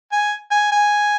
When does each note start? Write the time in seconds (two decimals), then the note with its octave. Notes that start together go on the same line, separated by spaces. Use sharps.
0.13 G#5
0.52 G#5
0.72 G#5